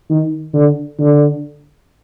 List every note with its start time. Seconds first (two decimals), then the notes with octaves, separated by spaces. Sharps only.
0.10 D#3
0.54 D3
0.99 D3